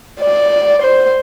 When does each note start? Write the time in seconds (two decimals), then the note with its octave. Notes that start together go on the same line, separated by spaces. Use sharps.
0.21 D5
0.82 C5